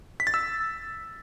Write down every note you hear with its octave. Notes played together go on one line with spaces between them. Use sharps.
B6
A6
E6